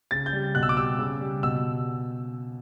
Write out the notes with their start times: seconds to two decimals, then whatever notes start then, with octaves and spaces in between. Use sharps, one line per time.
0.11 C#3 A6
0.26 G6
0.33 G3
0.55 B2 F#6
0.63 E6
0.69 D6
0.77 G3 E6
0.99 C#3
1.20 G3
1.43 B2 E6